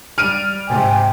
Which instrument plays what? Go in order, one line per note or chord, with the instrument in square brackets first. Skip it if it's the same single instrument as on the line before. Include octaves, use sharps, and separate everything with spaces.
[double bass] G3 [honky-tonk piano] F6 D7 D#7
[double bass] G#2 C3 [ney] G5 [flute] G#5